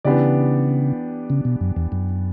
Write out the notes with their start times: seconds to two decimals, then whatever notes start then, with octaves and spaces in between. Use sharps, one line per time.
0.05 C#3 E3 B3 D4 G4 D5
1.30 C#3
1.45 B2
1.61 F#2
1.76 E2
1.92 F#2